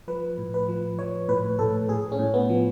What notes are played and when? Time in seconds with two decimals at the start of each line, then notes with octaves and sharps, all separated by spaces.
0.08 F3 B4
0.38 A2
0.54 B4
0.68 F3
0.99 F3 C#5
1.28 A2 B4
1.59 A2 A4
1.89 A2 G#4
2.12 C#4
2.19 A2
2.34 B3
2.49 F3